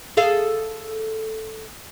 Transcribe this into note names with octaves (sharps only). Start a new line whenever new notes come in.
G#4 A4 F5